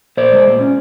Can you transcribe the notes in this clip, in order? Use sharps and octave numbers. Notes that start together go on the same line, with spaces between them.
A#2 C5 D5
G#3
A#2
C#4